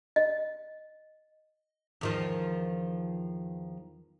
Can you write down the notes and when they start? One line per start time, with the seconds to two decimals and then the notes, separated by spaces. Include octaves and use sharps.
0.16 D#5
2.01 E2 D#3 F3